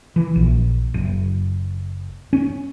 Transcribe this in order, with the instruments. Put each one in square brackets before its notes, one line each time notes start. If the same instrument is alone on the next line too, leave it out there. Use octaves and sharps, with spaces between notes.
[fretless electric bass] E3
A#1
F#1
C#4